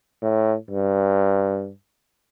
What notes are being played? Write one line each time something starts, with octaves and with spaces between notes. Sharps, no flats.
A2
G2